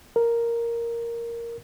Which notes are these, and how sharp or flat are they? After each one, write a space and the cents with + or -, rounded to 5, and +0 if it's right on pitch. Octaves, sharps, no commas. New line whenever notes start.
A#4 +0